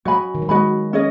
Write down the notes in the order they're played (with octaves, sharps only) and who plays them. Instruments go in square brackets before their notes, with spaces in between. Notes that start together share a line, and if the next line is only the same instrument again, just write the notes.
[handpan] F#3 [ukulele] F#4 D#5 G#5 B5
[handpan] D#3
F#3
[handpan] G#3 [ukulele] F#4 D#5 G#5 B5
[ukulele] C#4 G#4 D#5